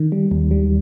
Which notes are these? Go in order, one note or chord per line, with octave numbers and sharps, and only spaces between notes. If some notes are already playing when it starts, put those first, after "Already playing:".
Already playing: D#3
G3
D#2
G3